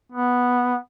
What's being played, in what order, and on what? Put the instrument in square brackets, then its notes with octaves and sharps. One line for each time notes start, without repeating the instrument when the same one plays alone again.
[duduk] B3